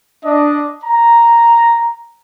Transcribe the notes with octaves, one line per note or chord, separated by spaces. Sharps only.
D4 D#5
A#5